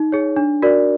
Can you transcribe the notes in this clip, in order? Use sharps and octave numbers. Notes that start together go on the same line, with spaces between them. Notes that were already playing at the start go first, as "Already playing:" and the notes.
Already playing: D#4
G#4 C#5
D4
F#4 A#4 D5